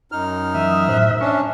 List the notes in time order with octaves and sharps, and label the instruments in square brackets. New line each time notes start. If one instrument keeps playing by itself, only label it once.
[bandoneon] F#2 D#4 F6
[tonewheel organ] E3 F#3 D#6 [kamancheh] E5
[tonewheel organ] A2 C5 F#6
[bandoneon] C#4 D4 [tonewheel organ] C#6